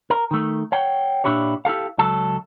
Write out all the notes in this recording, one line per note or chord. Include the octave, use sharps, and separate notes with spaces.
A#4
D#3 A3
C#5 F#5 G5
A#2 D4 E4 G4 C#5
E4 G4 A4 F5
C#2 F#3 A4 A5